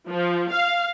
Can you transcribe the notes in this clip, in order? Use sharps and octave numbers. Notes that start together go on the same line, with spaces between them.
F3
F5